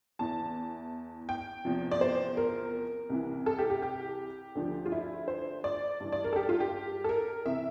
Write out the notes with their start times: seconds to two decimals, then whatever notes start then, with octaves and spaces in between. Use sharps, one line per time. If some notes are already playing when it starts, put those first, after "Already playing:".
0.19 E2 E3 A5
1.29 G5
1.65 E2 C3 F3
1.91 D5
2.01 C5
2.37 A#4
3.10 C2 C3 E3
3.46 A4
3.59 G4
3.70 G4
3.82 G4
4.55 D2 D3 F3
4.86 F4
4.92 E4
5.28 C5
5.64 D5
6.00 G2 E3
6.12 D5
6.24 A#4
6.33 A4
6.36 G4
6.49 F4
6.60 G4
7.04 A4
7.09 A#4
7.46 C3 E3 E5